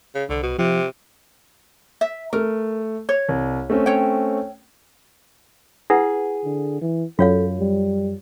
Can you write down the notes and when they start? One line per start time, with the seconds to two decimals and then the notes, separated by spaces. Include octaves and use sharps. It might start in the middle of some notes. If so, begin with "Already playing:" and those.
0.15 C#3
0.29 C2 D3
0.43 B2
0.58 C3 F3 F4
2.01 E5
2.33 A3 A#4
3.09 C#5
3.29 C2
3.70 A3 C4 C#4
3.86 C#5 G5
5.90 E4 G#4 B4 F#5
6.45 D3
6.82 E3
7.19 F#2 F4 A4 C#5 F5
7.60 G3